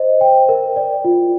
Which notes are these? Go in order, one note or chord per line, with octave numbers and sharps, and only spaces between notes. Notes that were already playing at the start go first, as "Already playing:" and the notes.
Already playing: C5 D#5
G5
A#4
D5
F4